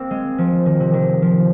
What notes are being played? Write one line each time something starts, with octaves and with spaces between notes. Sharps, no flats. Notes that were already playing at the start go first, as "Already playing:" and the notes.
Already playing: A#3 C4
G#3
F3
D#3
C3
D#3
F3